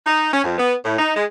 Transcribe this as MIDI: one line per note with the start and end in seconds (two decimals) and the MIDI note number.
0.07 0.31 63
0.32 0.43 61
0.44 0.56 41
0.58 0.75 59
0.84 0.97 45
0.98 1.11 63
1.16 1.25 56